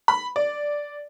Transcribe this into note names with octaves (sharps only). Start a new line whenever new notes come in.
B5
D5